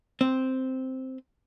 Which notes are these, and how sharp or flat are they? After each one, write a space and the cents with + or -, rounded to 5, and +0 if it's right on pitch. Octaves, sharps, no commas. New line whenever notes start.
C4 -5